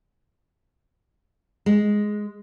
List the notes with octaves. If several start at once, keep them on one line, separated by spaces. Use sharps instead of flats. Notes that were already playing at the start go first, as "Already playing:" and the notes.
G#3